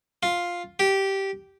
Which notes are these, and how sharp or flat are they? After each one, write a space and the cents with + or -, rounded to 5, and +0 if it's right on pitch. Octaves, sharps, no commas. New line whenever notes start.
F4 +5
G4 -10